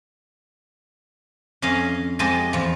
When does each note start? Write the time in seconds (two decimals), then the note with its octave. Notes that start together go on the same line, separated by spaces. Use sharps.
1.62 F2 C#4 D#5 F5
2.19 F2 F3 G#3 G4 D#5 A5
2.53 E2 F3